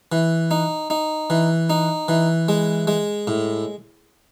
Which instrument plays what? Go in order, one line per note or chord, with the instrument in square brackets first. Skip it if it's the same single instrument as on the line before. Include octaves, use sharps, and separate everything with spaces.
[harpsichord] E3
D#4
D#4
E3
D#4
E3
G#3
G#3
A2